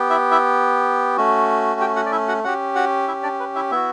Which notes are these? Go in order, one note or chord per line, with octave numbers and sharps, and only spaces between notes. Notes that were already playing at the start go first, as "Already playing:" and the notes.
Already playing: B3 G4
E4 E5
E4 E5
A3 C#4 F#4
G4 G5
F#4 F#5
D5
E4 E5
F#4 F#5
C#4 F#4 G4 F#5
F#4 F#5
E4 E5
D4 D5
B4
E4 E5
B3 E4 F#4 E5